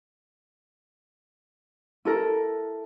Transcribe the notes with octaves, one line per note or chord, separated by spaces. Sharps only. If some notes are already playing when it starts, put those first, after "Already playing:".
E4 A4 A#4